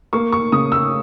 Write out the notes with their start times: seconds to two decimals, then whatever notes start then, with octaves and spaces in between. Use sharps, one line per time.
0.13 A#3 C#6
0.32 C#6
0.52 C#3 D#6
0.72 E6